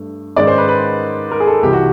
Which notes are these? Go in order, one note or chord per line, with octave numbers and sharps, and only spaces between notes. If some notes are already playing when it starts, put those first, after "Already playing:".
Already playing: G2 A3
G#2 D#3 G#3 C#4 D5
C5
B4
B4
A#4
G#4
A4
C2 C3 E3 G4
F#4